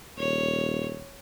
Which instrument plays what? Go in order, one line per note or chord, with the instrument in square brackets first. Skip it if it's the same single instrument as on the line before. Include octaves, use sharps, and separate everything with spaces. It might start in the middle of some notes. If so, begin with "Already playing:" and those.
[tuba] D#1 [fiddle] C#5